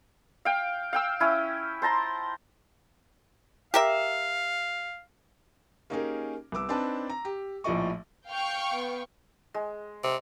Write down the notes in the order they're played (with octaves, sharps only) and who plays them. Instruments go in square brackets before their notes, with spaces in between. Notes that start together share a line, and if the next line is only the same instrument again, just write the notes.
[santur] F5 G5
F5 G5 E6
C#4 E4
C5 A5 A#5 C6
[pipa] G4 A#4 E5 [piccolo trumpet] F5
[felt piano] A#3 C#4 D#4 G4 G#4 A#4
C2 B3 D6 E6
C4 D4 D#4 B4 A5
A#5
G4
A#1 A2 F3 D5 D#5 C#6
[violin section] F5 G5 C#6 [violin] G6 F7
[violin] B3
[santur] G#3
[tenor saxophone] C3